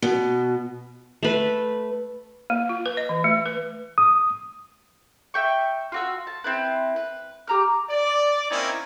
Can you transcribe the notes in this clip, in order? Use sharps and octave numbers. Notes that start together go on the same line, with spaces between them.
B2
A3 B4
A#3
F4
B4
D#5
E3
A3
B4
D#6
E5 G5 C#6
F4 F#4 E6
A5
C4 E4 B4
B4
G4 A#5 F6
D5
A#3 C4 C#4 D#4 E4 C#5